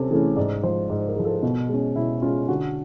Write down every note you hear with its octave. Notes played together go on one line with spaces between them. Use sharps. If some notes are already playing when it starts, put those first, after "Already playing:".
Already playing: C3 C#4 A4
E3 A3 C#4 G#4
G#2 D5
F3 G#3 C5
G#2
A#4
F3 G#3
A4
B2
G#3 C#4
B2 E4
G#3 C#4 F4
D3 F#4